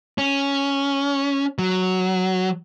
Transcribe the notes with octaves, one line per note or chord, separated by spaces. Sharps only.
C#4
F#3